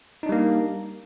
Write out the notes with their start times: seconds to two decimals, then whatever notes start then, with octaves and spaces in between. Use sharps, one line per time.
0.23 D#4
0.26 D4
0.29 G3
0.32 A#3